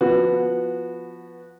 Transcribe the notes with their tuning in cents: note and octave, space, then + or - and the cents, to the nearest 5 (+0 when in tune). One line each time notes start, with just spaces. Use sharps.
F3 +0 B3 +0 F#4 -15